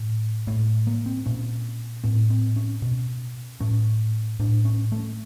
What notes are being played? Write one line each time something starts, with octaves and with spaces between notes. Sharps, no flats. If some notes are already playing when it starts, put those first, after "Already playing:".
Already playing: A2
A2 A3
A#3
C4
A#2 C#4
A2 C4
C4
C#4
B2
A2 C#4
A2 D4
C#4
A3